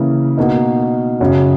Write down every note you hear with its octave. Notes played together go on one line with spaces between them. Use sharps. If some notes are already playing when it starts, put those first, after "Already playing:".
Already playing: C#3 E3 A#3 E4
B2 A#3 D#4
F#2 C#3 F#3